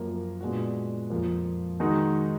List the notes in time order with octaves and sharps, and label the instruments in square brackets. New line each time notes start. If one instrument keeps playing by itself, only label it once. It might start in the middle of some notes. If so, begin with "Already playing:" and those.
Already playing: [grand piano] F#2 F3 A#3
A#2 G#3 B3 D4 F#4
F2 F3 A#3
D#3 G#3 D#4 F#4